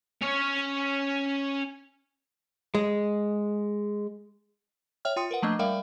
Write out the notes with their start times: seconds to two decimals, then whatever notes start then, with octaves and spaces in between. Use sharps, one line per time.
0.22 C#4 C#5
2.75 G#3
5.05 C#5 E5 G5 F6
5.16 F4 G5 C6 D#6 C#7
5.31 A#4 B4 F#5
5.42 F3 F#3 A3 A#3 D4 D#5
5.59 G3 A#4 D5 E5 F5 G5